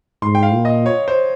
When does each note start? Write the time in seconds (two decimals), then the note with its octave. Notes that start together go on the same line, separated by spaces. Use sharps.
0.22 G#2 C6
0.35 G5
0.43 F5
0.54 A#2
0.65 D#5
0.86 C#5
1.08 C5